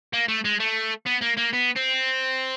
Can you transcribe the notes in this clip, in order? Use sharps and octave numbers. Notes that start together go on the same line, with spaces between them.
A#3
A3
G#3
A3
B3
A#3
A#3
B3
C4